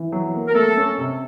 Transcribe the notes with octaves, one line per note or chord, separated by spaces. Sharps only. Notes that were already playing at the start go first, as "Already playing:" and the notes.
Already playing: E3
F#3
A#3
A#4
A3 A4
C#4
C3